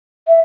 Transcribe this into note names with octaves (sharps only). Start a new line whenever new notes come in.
E5